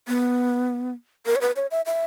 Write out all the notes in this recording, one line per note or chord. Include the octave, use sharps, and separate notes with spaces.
B3
A#4
C#5
B4
C#5
E5
E5